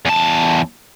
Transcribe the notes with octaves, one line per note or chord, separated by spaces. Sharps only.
E2 A5